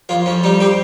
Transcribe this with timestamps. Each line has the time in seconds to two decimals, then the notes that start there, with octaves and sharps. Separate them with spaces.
0.09 F2 F4
0.26 F2 C#4
0.43 G3 D#4
0.60 C4 G4